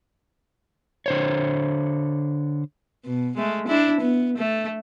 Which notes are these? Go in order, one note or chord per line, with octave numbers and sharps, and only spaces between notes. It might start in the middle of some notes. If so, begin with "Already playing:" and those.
D3 C5 C#5
B2
G#3 A3
D4 E4
B3
A3